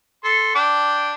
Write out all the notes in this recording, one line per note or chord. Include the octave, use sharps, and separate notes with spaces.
A4 C6
D4 G5 D6